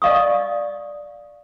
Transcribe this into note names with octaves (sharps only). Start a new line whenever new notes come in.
D5 D#5 F5 C#6 D#6